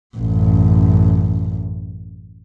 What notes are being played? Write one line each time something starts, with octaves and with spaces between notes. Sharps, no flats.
A1 F#2